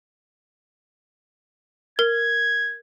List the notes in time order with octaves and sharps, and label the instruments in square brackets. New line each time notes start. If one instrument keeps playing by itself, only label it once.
[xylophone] A#4 [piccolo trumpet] G#6